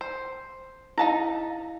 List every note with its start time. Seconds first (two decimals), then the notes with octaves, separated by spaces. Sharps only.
0.01 C5
0.98 D#4 E4 F5 A5 A#5